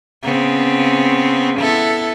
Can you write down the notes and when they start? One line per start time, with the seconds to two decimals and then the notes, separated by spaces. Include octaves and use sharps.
0.23 C#3 B3 C4
1.59 B3 E4 A4